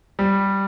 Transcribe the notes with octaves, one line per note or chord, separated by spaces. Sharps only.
G3